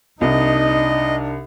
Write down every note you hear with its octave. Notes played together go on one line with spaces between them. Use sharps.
C2 D4 D#4 D#5